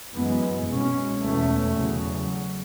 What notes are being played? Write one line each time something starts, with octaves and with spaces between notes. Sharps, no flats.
F#2 E3 G#3 B3
B2 G#3 C#4
E2 B2 A3 C#4
E2 C#3 F#3